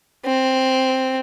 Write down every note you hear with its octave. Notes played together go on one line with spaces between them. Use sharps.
C4